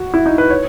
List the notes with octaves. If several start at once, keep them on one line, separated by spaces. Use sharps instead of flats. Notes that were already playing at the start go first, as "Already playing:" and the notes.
Already playing: F#4
E4
D#4
B4
C#5